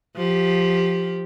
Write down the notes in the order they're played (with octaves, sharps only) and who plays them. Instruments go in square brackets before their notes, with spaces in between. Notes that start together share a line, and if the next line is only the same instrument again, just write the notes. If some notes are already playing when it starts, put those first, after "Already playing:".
[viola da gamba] F3 G4